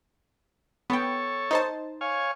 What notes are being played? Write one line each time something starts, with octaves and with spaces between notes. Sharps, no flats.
B3 A4 C#5 G5
D#4 C5 A5
C#5 F5 G#5